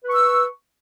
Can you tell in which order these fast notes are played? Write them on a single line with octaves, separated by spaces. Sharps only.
B4 C#6 E6